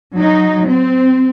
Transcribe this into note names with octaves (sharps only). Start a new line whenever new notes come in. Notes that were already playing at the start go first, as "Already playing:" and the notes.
F#3 D#4
C4